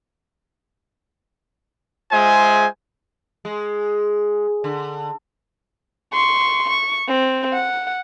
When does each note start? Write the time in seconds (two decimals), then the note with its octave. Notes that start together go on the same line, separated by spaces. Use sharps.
2.12 G#3 F4 G#4 C5 E5 G#5
3.45 G#3
4.64 D3
6.13 C6 C#6
6.69 C#6
7.08 C4
7.53 F#5